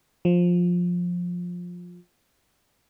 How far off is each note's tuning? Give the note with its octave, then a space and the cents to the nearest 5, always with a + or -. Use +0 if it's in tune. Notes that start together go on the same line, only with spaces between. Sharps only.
F3 +15